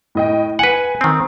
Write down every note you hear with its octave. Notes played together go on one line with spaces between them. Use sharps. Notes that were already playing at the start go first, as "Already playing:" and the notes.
A2 D#5 G5
B4 F#5 G#5
D#3 C4